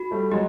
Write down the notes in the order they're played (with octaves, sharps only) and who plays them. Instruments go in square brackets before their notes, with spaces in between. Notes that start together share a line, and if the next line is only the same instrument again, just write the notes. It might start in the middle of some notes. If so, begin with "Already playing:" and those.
Already playing: [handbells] F#4
[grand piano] G3 A3
[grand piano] F#3 G#3 [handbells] G4